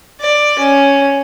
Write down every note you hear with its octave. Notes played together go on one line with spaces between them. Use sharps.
D5
C#4